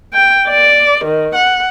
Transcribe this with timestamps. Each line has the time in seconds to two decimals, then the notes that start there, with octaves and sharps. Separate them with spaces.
0.14 G5
0.48 D5
1.05 D#3
1.35 F#5